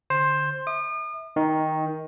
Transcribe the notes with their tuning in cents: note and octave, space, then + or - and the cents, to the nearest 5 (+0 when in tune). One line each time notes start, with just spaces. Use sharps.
D3 +0 C5 +10
E5 -25 D#6 -45
D#3 +15 D#4 +0